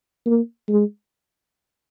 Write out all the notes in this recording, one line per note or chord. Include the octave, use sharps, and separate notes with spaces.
A#3
G#3